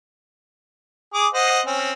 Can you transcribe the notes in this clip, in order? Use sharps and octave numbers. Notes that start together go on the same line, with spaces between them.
G#4 D6 D#6
C5 D#5 F#5
C4 C#4